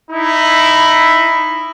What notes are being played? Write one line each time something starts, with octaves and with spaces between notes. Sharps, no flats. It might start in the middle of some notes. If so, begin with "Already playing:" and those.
D#4 E4